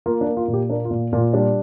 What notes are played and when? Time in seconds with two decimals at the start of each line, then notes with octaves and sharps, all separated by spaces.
0.06 A#3 F4
0.21 D4
0.27 A#3
0.37 F4
0.48 A#2
0.53 G4
0.70 A#3 D4
0.85 F4
0.91 A#2
1.13 A#2
1.18 F4
1.33 G3 D4